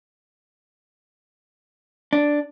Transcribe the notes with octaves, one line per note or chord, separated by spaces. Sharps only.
D4